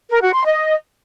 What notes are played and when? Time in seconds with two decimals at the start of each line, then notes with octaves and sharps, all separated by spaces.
0.10 A#4
0.22 F#4
0.33 C6
0.45 D#5